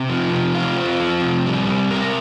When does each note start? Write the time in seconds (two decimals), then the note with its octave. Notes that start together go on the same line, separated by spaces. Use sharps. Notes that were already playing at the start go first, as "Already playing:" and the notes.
Already playing: C3
0.10 F3
0.32 C3
0.54 F4
0.77 C4
1.00 F3
1.22 C3
1.46 G3
1.67 C3
1.91 A#4